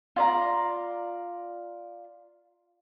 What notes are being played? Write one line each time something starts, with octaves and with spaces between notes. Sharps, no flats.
F4 D5 A#5